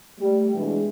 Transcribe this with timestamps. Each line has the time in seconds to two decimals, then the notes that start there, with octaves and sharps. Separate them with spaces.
0.19 G3 A3
0.55 B2 E3 G#3 D4 G#4